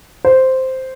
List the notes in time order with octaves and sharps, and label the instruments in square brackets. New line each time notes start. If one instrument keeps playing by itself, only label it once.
[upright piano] C5